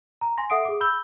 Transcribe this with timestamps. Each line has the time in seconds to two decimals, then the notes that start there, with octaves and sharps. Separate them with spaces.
0.21 A#5
0.38 G#5 C6 A#6
0.50 A4 E5 F#5 D#6 C7 D7
0.65 G#4 D6
0.81 B5 E6 G6 G7